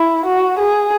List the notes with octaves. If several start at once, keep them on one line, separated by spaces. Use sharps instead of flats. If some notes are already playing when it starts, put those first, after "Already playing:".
Already playing: E4
F#4
G#4